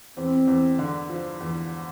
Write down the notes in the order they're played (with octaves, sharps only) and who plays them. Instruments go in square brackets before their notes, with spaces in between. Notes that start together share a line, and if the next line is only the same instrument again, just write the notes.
[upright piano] E2 [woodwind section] C4
[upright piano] E2
D3
F3
E2